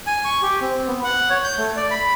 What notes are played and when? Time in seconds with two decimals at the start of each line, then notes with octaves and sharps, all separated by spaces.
0.07 G#5
0.25 C#6
0.42 G4
0.61 C4
0.87 B3
1.04 F#5
1.30 C#5
1.44 G6
1.58 A3
1.77 D5
1.91 B5